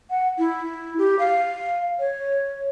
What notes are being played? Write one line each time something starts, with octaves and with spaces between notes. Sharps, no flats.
F#5
E4
G4
F5
C#5